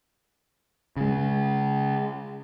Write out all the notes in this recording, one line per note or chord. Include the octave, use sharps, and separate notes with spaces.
C#3 G#3